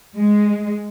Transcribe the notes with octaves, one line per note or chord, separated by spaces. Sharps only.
G#3